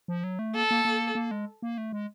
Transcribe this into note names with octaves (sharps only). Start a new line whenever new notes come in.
F3
F#3
A3
A#3 A4
A#3
A#3
A#3
G#3
A#3
A3
G#3